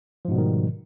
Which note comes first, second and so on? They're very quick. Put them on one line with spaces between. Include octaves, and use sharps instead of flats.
F3 G#2 B2 G3 D#3